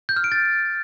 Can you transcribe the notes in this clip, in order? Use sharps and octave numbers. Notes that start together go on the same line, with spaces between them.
G6
F6
D7
A6